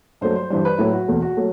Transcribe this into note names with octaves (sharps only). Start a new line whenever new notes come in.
G2 F#3 A3 C5
C5
G2 E3 G3 C5
B4
A2 F#3 A3 E4
F#4
E2 B2 A3
F#4
F#3 A3